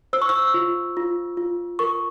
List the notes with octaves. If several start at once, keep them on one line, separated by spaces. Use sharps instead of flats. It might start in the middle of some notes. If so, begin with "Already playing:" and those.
C5 E6
C#6
E6
F4
F4
F4
A#4 C#6